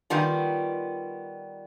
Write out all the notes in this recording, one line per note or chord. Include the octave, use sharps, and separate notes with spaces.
D#3 G3 B3 F4